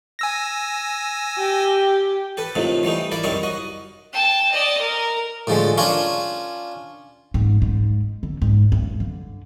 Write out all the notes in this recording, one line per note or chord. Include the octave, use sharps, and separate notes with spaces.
G#5 E6 A#6
G4
G4 A4 B4
A2 C3 D#3 F3
E3 G3 A3 D#4
E4 A#4 D5 E5
C2 F#2 D#3 G3 A#4 C#6
F#4 D#5
G5 A5
D5 D#5
A#4
A2 D3 F3 G#3
C#4 D4 F4 A#4 C#5
G#2
G#2
D3
G#2
G2
D3